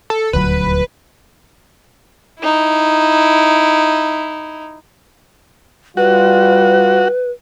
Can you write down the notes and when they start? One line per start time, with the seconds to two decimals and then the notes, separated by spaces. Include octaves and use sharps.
0.10 A4
0.33 D#1 D2 F#3 B4
2.39 D#4 E4
5.97 G3 F4 F#4 B4